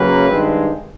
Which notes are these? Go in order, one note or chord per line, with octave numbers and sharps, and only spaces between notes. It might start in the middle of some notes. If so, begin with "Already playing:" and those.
Already playing: F#2 C#3 F#3 A#3 C#4 B4
G2 D#3 G#3 C4